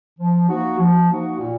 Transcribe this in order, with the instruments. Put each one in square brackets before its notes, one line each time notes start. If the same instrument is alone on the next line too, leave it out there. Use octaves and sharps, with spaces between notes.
[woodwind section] F3
A#3 D#4 F#4
F3
A#3 D#4 F#4
A#2